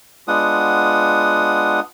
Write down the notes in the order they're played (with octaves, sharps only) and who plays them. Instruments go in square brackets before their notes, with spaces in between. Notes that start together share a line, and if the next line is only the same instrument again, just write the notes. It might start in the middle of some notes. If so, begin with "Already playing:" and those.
[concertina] G#3 B3 D4 F4 F#5 D#6